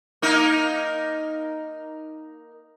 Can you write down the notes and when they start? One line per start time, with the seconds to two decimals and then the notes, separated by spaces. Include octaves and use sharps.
0.22 A#3 D#4 A#4